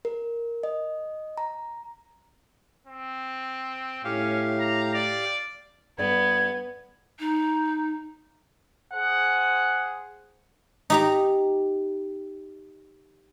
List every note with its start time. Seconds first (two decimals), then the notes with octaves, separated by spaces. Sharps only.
0.05 A#4
0.63 D#5
1.38 A#5
2.87 C4
4.04 A2 C#4 G4 F5
4.60 A#5
4.94 D5
5.98 G2 B3 A4 D5 G#6
7.19 D#4
8.93 G#4 C5 F#5
10.90 D#4 G4 A#5